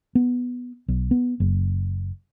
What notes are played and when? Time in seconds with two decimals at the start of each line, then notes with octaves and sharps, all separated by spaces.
0.15 B3
0.88 B1
1.11 B3
1.40 F#1